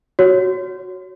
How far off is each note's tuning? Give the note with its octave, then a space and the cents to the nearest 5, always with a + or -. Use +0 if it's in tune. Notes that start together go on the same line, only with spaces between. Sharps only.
F#4 +0 C#5 +0